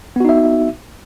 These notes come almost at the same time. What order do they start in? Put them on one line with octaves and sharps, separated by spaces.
B3 F#4 D#4 E5